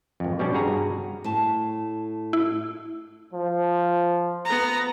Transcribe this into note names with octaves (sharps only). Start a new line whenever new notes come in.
G#1 F2
B2 G3 C#4 D4
G2 F#4 G#4 A#5
A2 A5
E4
F3
B3 A#5